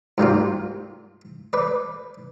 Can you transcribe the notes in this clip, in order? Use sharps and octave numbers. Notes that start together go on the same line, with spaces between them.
G#2 G3 A#3 F4
B4 D5